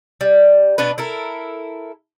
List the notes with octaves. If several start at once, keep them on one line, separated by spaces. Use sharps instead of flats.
G3
B2 B3 D4 B4
E4 A4 A#4